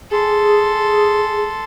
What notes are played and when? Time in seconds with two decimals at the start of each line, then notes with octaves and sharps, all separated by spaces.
0.11 G#4 A4 C6